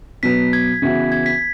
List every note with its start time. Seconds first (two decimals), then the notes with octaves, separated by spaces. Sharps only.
0.23 B2 F#3 B3 B6
0.53 G#6
0.82 C#3 E3 B3 F#4 E5
1.12 G#6
1.26 B6